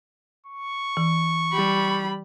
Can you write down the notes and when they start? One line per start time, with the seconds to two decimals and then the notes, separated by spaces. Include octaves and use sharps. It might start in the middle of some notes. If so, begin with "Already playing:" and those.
0.46 C#6
0.97 E3
1.53 G3 B5